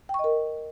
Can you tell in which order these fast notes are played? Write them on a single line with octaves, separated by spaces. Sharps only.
G5 C#6 D#5 A#4